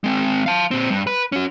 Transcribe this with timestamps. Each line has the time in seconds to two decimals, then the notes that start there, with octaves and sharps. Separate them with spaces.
0.04 G#3 C4
0.46 F5 A5
0.71 A#2 C4
0.90 G2
1.07 B4
1.32 C#4 F#4